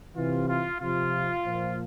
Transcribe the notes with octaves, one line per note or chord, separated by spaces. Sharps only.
C3 E3 F4
F4
C3 F3 F4
A#2 F3